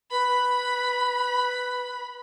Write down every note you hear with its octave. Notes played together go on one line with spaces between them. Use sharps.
B4 B5